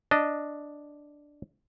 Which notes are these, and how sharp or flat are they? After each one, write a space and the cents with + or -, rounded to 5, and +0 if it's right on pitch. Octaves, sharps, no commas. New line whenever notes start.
D4 +0 D#5 +0